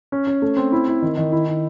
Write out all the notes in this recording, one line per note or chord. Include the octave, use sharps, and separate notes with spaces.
C#4
C#4
A3
C4
E4
E4
D#3
D#3
E4
E4